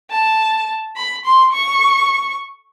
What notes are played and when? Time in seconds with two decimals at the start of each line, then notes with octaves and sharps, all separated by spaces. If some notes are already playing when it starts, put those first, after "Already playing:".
0.10 A5
0.96 B5
1.25 C6
1.53 C#6